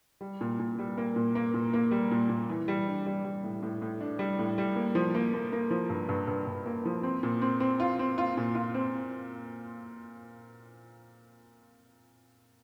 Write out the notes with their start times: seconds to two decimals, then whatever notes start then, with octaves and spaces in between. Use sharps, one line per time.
0.21 G3
0.41 A#2
0.59 A#2
0.79 G3
0.98 A#3
1.16 A#2
1.35 A#3
1.54 A#2
1.73 A#3
1.91 G3
2.11 A#2
2.29 A#2
2.49 E3
2.68 G3
2.87 D4
3.06 G3
3.24 G3
3.44 A2
3.62 A2
3.82 A2
4.01 D4
4.19 G3
4.39 A2
4.58 G3
4.76 A#3
4.95 F3
5.15 A#3
5.34 A#3
5.52 A#3
5.71 F3
5.90 G2
6.09 G2
6.27 G2
6.47 G2
6.66 A#3
6.85 F3
7.03 C4
7.23 A#2
7.42 C4
7.60 C4
7.80 F4
7.99 C4
8.18 F4
8.37 A#2
8.55 F4
8.74 C4